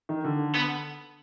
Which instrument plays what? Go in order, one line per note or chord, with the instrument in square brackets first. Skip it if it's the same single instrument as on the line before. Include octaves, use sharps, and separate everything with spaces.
[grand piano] D#3
D3
[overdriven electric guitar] B3